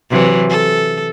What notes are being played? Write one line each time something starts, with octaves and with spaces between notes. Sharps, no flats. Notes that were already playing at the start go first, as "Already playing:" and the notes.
C3 E3 F#3
A4